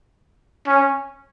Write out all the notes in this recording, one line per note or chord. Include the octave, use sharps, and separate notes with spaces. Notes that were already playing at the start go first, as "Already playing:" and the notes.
C#4